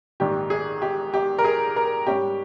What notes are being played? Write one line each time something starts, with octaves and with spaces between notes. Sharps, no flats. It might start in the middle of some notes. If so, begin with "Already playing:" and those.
A#1 G#2 D#3 A#3 G4
G#4
G4
G4
A#4
G#4
A#4
G#2 G3 C#4 G4